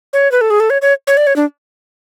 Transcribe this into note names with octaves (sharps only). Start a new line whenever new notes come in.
C#5
B4
A4
G#4
A4
C#5
C#5
C#5
D5
C#5
D4